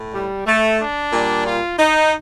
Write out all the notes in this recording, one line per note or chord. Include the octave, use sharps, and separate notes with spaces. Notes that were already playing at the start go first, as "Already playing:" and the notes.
Already playing: A2
G3
A3
D4
A#2 G3
F4
D#4